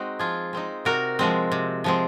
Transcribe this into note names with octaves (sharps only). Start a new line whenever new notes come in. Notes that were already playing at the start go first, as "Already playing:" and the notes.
Already playing: G#3 C4 D#4 F#4
F3 F4 G#4
G#3 C4 D#4
C3 F#4 A#4
F3 G#3 C4
C3
F3 G#3 C4